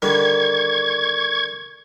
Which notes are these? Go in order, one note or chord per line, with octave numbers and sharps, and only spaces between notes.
D3 D#3 G3 C#6 G#6